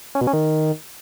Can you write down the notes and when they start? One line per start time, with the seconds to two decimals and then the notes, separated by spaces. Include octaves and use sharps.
0.15 C#4
0.21 B2
0.27 C#4
0.33 D#3